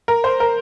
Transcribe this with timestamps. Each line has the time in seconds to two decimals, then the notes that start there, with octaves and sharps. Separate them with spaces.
0.08 A#4
0.24 C5
0.40 A#4